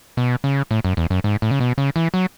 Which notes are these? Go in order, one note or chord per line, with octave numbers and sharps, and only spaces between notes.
B2
C#3
A2
F#2
E2
F#2
G#2
A2
C#3
B2
C#3
E3
F#3